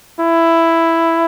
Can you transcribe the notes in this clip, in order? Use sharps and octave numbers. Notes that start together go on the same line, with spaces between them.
E4